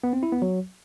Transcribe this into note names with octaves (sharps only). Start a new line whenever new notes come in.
B3
C4
E4
B3
F#3